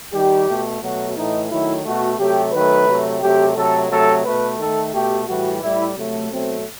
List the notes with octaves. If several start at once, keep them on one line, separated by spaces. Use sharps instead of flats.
D#3 G3 G4
B2 A3
B2 F#3 A3 F#4
A2 E3 A3 D#4
D#3 F#3 A3 E4
B2 A3 F#4
C3 F#3 A3 G4
D#3 F#3 A3 B4
C3 F#3 A3
C3 F#3 A3 G4
C3 F#3 A3 A4
C3 F#3 A3 A4
B2 A3 B4
D#3 A3 A4
B2 A3 G4
A2 E3 G3 F#4
A2 G3 E4
C3 F#3 A3
B2 F#3 A3 C4